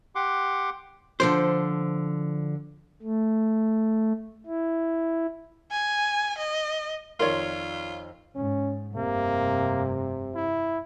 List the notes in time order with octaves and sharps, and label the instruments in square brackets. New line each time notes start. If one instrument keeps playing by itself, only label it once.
[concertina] G4 F#5 C6 D6
[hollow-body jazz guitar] D3 F3 C5
[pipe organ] A3
E4
[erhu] G#5
D#5
[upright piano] F2 D#3 [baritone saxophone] F4 [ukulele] A#4 D5 [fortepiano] C#5 C6
[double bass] G#2 [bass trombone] C#4
[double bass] F1 G2 [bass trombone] C3 [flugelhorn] A#3
[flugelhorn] E4